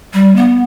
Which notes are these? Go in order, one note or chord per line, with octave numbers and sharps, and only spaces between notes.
G3
B3